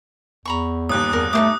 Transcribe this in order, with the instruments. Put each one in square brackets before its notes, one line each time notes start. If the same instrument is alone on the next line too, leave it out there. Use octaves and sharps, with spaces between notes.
[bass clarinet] E2 [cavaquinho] A#5 B5 C#6
[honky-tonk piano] G1 D#2 [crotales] D#6 F#6
[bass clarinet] E2 [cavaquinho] A#4
[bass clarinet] A3 [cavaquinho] D#4 C5 D6 [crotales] D#6